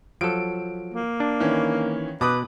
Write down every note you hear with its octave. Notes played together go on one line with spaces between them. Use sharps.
F3 F#3 A4 D7
A#3
D4
D#3 E3 C#4
B2 B4 D6 D#6 F#6